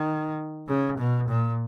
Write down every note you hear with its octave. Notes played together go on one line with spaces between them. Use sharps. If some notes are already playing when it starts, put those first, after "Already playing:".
Already playing: D#3
C#3
B2
A#2